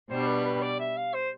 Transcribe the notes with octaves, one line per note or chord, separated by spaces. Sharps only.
B2 G3 D4 C5
B4
B4
D5
E5
F5
C5